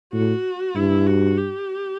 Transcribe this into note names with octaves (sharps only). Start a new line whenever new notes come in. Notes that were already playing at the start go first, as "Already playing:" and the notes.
A2 F#4
G2 E4
F#4
G4